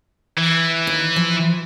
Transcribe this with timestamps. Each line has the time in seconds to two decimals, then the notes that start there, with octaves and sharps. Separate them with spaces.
0.37 E3
0.87 D#2
1.16 F3